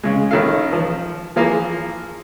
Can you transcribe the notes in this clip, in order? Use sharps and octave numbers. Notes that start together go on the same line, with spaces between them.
C#3 G#3
A#1 D#3 C#4 A4 F5
F3
E3 F3 A#3 F4 G#4 A#4